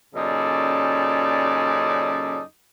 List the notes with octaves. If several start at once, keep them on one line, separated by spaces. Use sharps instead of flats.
F#2 A#2 C#3 D#4 A4 D5